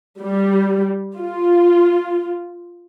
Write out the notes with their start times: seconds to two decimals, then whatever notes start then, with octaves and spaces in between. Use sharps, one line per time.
0.21 G3
1.18 F4